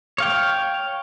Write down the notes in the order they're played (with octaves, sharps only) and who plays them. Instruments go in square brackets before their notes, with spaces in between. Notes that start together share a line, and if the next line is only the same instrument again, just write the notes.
[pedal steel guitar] C#5 F5 G5